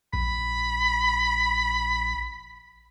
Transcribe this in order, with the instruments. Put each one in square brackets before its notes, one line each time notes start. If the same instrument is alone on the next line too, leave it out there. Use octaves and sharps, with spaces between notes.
[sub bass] A#1 [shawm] B5